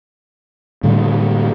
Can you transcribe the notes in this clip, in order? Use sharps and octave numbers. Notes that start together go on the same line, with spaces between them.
A2 D3 G3